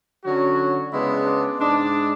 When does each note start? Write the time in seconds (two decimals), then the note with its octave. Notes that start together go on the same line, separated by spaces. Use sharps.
0.25 D3 F#3 C#4 F#4
0.92 C#3 G#3 B3 D4 E4
1.25 D4
1.59 G#2 G#3 D4